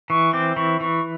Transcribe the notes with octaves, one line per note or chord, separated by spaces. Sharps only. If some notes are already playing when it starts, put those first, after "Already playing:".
E3 C#6
C4 D6
E3 C#6
E3 C#6